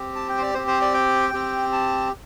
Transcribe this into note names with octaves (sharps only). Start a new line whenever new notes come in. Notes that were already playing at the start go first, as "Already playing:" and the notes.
Already playing: C4 G4
A5
G5
C5
D5
C4 G4 C5
C5
D5
G5
C4 G4
A5